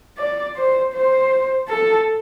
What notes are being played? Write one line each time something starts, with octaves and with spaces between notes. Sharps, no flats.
D5
C5
C5
A4